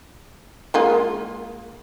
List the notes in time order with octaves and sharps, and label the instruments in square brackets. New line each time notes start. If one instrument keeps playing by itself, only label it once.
[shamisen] G#3 A#3 F4